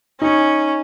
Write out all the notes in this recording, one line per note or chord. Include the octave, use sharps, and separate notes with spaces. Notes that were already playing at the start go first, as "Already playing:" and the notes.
C#4 D#4